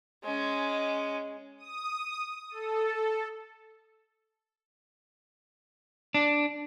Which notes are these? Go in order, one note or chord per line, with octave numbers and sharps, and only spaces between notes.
G#3 C#4
D#6
A4
D4